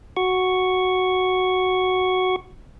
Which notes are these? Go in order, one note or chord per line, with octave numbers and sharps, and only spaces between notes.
F#4 C#6